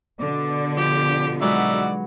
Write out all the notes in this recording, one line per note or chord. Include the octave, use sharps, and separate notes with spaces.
B2 D3 D5
F3 G4
F#3 G#3 D#4 F#4 B4 D5 E5